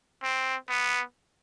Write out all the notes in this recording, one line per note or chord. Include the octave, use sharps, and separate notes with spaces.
C4
B3